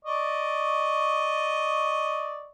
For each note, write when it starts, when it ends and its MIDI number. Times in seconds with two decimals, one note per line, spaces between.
0.05 2.49 74
0.05 2.49 75
0.05 2.49 85